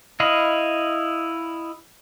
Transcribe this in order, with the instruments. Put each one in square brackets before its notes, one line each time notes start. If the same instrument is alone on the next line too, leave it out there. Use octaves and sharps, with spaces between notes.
[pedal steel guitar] E4 D#5 F5 B5